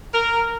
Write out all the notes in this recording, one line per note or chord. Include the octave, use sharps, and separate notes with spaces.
A#4